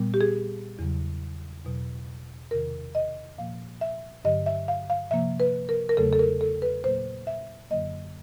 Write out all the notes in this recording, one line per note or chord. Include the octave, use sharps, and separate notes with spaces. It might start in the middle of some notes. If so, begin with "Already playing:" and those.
Already playing: A#2 G3 B3
G4
G#4
E2 C#3 F#3
E2 B2 F#3
E2 C3 D#3 A#4
D#5
A#2 F3 A#3 F5
E5
G2 D3 F#3 D#5
E5
F5
F5
C3 F3 A#3 E5
B4
A#4
A#4
E2 C#3 F#3 A3 A4
A4
A#4
A4
B4
A#2 F#3 A#3 C5
E5
F#2 D3 F#3 A#3 D#5